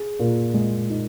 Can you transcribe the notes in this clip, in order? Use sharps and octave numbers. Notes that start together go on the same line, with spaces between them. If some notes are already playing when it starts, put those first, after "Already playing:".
Already playing: G#4
A#2
G#3
D#4